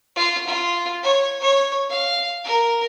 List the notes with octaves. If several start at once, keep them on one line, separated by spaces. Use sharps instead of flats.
F4
F4
C#5
C#5
F5
A#4